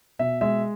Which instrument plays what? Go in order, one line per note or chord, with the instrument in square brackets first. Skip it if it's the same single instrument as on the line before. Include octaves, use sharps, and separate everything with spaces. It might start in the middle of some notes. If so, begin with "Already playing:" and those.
[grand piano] B2 E5
G#3 E5